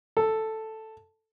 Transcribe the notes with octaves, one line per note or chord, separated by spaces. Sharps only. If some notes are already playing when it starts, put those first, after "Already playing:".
A4